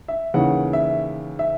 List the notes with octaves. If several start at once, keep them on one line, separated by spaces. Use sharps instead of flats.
E5
D#2 C#3 E3 F#5
E5
E5